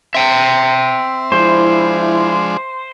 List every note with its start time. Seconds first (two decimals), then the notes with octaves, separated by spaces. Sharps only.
0.15 C4 E5 G5
1.32 F3 G#3 D4 E4 C5